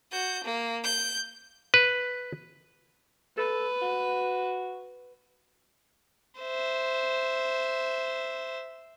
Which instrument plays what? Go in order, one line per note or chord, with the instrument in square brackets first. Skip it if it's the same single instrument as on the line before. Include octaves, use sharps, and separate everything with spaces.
[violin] F#4 G6
A#3
G6
[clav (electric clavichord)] B4
[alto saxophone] A4 [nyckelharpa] B4
[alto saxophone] F#4
[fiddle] C5 E5